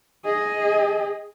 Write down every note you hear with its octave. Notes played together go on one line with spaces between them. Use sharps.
G#4 D#5